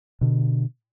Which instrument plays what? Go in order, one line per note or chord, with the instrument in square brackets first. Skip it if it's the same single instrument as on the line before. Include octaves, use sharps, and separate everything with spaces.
[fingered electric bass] B2 D3